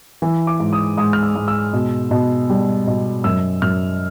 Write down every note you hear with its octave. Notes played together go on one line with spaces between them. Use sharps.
E3
D6
G#2
D#6
G#2 D#6
F6
E6
G#2
E6
B2
B2
G3
B2
F#2 E6
F#2 F6